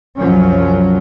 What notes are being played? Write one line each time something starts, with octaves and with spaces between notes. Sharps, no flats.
C2 F#2 F3 F#3 C#4